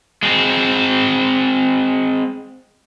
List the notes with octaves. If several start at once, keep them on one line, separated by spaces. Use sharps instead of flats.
G#3 C4